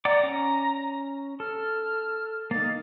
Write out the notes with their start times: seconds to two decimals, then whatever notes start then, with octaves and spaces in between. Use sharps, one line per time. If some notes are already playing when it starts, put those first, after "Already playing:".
0.05 D5 F#5 A#5 D6
0.23 C#4
1.40 A4 F6
2.51 A#3 D#4 A6